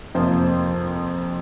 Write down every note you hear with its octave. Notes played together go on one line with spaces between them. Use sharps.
F2 C3 F3 A#3 C5